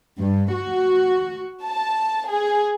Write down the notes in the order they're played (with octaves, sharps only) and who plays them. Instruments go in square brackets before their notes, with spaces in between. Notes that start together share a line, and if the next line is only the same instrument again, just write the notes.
[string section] G2
F#4
A5
G#4